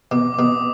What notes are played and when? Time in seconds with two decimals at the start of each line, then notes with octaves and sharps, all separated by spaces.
0.11 B2 D6
0.34 D6
0.39 B2 D#6